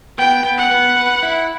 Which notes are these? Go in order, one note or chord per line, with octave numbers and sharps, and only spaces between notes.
B3 G5
B3
F#5
B3
B4
E4